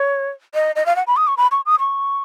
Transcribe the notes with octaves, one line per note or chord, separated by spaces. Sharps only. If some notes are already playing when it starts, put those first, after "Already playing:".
Already playing: C#5
D#5
D#5
F5
F#5
B5
D#6
C#6
B5
C#6
D#6
C#6